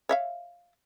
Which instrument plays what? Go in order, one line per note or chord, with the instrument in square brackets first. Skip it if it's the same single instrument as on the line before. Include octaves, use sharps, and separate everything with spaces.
[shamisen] C#5 E5 F5